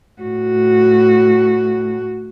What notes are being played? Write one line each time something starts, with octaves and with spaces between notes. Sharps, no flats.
A2 F#4